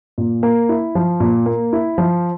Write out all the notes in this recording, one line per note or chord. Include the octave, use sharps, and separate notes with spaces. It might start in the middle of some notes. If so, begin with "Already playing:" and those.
A#2
A#3
E4
F3
A#2
A#3
E4
F3